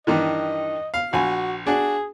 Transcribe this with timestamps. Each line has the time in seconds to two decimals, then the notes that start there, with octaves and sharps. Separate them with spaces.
0.07 G2 D#3 E3 D#5
0.94 F5
1.13 A#1 F#4 G#5
1.67 D4 F#4 G#4